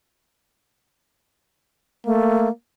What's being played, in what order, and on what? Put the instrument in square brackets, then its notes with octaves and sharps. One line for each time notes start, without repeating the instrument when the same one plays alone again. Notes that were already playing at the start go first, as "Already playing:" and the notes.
[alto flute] A3 [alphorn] A#3